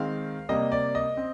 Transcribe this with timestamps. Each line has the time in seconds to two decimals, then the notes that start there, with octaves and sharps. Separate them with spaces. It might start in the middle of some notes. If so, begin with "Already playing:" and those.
Already playing: D#3 G#3 C4 F5
0.49 C3 G3 A#3 D#5
0.72 D5
0.95 D#5
1.17 C4